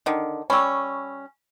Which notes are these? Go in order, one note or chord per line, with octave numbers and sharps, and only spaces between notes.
D3 D#3
G3 C#4 B5 C#6 E6